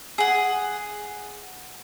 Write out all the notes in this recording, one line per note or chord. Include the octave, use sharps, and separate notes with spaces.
G#4 F#5